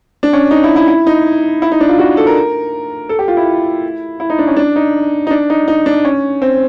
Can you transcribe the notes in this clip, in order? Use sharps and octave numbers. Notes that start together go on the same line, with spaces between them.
D4
C#4
D#4
E4
E4
E4
D#4
E4
D#4
D4
F4
F#4
A4
A#4
A4
G4
F4
E4
E4
D#4
D4
C#4
D4
D#4
D#4
D4
D#4
D#4
D4
C#4
C4